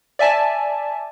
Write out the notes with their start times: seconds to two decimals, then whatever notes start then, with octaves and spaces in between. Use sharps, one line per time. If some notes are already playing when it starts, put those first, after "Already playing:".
0.19 D5 E5 G#5 A5